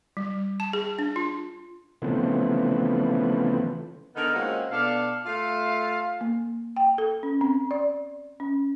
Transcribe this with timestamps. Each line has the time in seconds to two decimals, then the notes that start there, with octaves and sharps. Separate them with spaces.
0.17 G3
0.60 A5
0.73 G#4
0.99 D4
1.16 F4
2.02 C#3 E3 F3 A3 B3 C4
4.16 D3 B3 D#4 A#4
4.34 G#3 A#3 C4 C#4 F4 F#4
4.72 B2 D4 A4 D5 F5
5.26 A3 F4 E5 F5
6.21 A#3
6.77 G5
6.98 A4
7.23 C#4
7.41 C4
7.71 D5
8.40 C#4